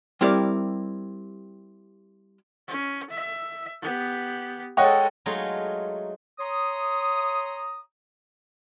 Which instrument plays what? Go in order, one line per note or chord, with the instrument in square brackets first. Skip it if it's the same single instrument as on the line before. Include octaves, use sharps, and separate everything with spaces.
[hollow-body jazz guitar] G3 C4 E4 G4 A#4 D5
[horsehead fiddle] C#4
E5
B3 G4
[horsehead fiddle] G#3 A4 [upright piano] C#5 D#5 F#5 [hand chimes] G5
[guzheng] F#3 G#3 A3 D#4 F4
[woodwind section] C#5 A#5 C6 D#6